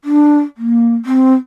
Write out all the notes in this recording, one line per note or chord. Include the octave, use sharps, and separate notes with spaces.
D4
A#3
C4